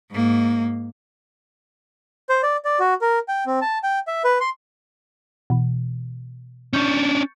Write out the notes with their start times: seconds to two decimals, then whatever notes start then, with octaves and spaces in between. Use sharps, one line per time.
0.11 G#2 A#3
2.29 C5
2.43 D5
2.65 D5
2.80 F#4
3.01 A#4
3.28 G5
3.46 C4
3.61 A5
3.83 G5
4.07 E5
4.24 B4
4.40 C6
5.50 B2 E3
6.73 C#4 D4 C#6 G6 C#7